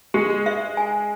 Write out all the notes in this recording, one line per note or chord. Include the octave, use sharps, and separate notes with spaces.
G#3 G4
E5
G#5